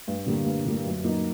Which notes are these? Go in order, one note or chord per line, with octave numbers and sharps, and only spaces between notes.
G2
D3 G3 A#3
G2
D3 G3 A#3
F#2
F#3 A#3 D#4 F#4